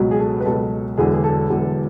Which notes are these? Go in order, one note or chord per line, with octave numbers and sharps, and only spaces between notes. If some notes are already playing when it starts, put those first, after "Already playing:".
Already playing: C#2 B2 F#3
G#4
A4
B4
C#2 B2 F#3 A4
E1 E2 D3 F#3 G#4
G#4
A4
E1 E2 D3 F#3